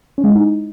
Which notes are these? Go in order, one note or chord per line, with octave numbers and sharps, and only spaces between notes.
C#4
G#3
E4
D#4